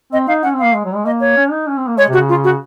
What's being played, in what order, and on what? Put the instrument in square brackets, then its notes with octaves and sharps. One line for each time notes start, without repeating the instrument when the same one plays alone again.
[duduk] C4 [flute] D#5
[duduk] D#4 [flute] F5
[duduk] C#4 [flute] F#5
[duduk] C4
[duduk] A#3 [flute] F5
[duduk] G#3
F#3
G#3
[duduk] A#3 [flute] D#5
[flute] C#5
[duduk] C#4
D#4
C#4
C4
A#3
[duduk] G#3 [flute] C#5
[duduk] C3
[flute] F#4
[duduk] C#3
[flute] F4
F#4